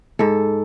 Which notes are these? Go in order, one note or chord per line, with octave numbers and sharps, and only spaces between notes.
G#2 A4